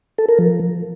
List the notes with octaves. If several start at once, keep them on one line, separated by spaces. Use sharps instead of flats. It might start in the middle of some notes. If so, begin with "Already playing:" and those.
A4
A#4
F3